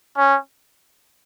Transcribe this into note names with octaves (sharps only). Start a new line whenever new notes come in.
C#4